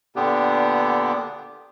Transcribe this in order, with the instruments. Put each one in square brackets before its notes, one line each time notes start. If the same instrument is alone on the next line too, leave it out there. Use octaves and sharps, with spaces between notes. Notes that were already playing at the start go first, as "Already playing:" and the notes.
[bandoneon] A#2 D3 B3 D4 G4